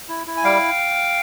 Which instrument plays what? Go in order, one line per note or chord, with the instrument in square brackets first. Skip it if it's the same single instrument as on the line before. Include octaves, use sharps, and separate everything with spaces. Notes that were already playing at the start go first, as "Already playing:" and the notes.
[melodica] E4
E4
G#5
G3 F5 G5